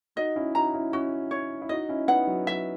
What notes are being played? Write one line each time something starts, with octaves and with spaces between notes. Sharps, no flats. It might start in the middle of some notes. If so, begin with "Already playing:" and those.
D#4 F#4 D#5
C#4 E4
D#4 F#4 A#5
C#4 E4
C#4 E4 F#4
C#5
E4
D#4 F#4 D#5
C#4 E4
B3 D#4 F#5
F#3
F#3 E5